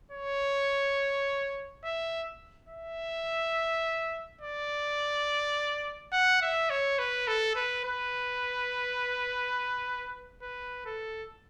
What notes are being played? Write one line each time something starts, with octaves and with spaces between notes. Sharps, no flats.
C#5
E5
E5
D5
F#5
E5
C#5
B4
A4
B4
B4
B4
A4